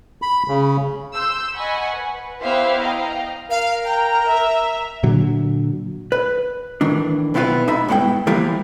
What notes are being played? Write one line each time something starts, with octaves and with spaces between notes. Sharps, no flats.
B5
C#3
C6 E6 G6
D#5 F#5 G#5 B5 C#6
B4
B3 E4 G4 C5 E5 F5
D#5 F5 G5 A#5
A#4 F5
G5 A#5
E5
A#2 D3 F#3
B4
A2 D#3 E3 D4
B1 B3 C4 E4 F4 B4
D#4 E5 B5
G2 G#3 B3 E4 F5 G5
E3 F3 G3 A#3 E4